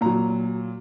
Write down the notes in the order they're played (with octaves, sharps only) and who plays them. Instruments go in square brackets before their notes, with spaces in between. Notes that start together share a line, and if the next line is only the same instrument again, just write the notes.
[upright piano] A#2 F#3 A#5